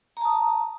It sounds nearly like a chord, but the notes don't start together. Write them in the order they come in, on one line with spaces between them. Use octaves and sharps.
A#5 A5 D#6